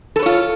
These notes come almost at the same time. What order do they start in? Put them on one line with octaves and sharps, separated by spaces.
A4 B4 C#5 F4